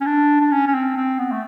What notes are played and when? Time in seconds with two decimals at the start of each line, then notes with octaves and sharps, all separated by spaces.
0.01 C#4
0.06 D4
0.41 D4
0.51 C#4
0.67 C#4
0.74 C4
0.96 C4
1.18 B3
1.32 A3